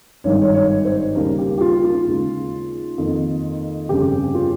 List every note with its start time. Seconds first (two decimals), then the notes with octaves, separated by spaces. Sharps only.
0.24 G#1 G2 D#3 C#5
0.42 C#5
0.54 C#5
0.85 C5
1.15 D#2 C#3 G3 A#4
1.38 G4
1.58 G4
1.61 F4
1.84 F4
2.07 D#2 C#3 G#3
2.98 F2 D#3 A#3
3.89 G1 F2 C#3 G4
4.35 F4